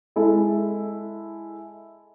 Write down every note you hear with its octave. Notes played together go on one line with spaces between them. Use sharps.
G#3 E4 A4